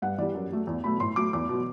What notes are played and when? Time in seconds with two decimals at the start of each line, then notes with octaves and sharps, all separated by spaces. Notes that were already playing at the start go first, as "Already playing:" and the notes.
0.02 G2 F#5
0.18 E3 G3 D5
0.35 F#2
0.51 F#3 A3
0.67 E2
0.84 B2 F#3 A3 B5
1.00 A2 C6
1.16 F#3 A3 D6
1.33 E2 D6
1.49 B2 F#3